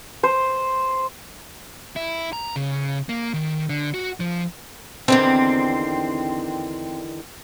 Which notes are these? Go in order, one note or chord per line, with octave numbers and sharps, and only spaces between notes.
C5
E4
A#5
C#3
A#3
D#3
D3
F#4
F3
E2 D3 D#3 C4